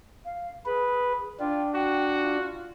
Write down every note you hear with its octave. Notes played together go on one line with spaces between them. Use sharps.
F5
G#4 B4
D4 F4 G5
F#4 G5
F4